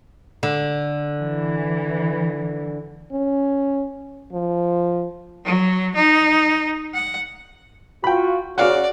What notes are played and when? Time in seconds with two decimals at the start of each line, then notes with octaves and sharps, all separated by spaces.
0.43 D3
1.20 E3
3.12 C#4
4.33 F3
5.45 F#3
5.95 D#4
6.94 F#5
8.04 F4 F#4 G5 B5
8.58 C#3 F#4 D5 F5 F#5